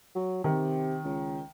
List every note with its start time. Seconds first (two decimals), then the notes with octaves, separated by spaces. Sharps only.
0.15 F#3
0.44 C3 D#3
1.04 C#2